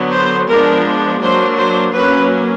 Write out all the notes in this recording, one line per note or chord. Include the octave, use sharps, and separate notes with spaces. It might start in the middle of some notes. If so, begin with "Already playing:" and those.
Already playing: D3 F#3 B3
C5
F3 G#3 B3 D4 A#4
F#3 A#3 D4 C5
C5
F#3 A#3 C#4 B4